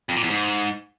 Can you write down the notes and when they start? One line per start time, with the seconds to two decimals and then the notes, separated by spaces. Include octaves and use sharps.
0.09 F2
0.16 A#2
0.23 E2
0.30 G#2